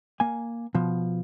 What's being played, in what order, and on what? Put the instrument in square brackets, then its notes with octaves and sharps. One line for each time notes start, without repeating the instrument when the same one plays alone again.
[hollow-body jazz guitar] A#3 G#5
B2 F3